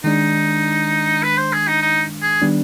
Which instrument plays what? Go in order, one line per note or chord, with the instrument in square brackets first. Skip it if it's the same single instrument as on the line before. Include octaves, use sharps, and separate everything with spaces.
[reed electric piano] D#3 G#3 D4 [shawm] D#4
[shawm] B4
C5
G#4
D#4
D#4
G#4
[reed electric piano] D#3 G3 B3 D4